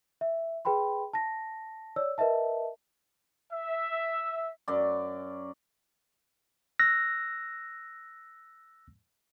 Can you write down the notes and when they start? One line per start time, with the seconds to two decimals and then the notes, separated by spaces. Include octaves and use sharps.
0.21 E5
0.65 G#4 B4 G5 B5 C6
1.13 A5 A#6
1.96 C#5 D5 E6
2.18 A#4 B4 D#5 E5 A5
3.52 E5
4.68 F#2 D5
6.79 E6 F#6 A#6